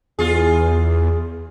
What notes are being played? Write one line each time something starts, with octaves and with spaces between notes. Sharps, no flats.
E2 F4 G#4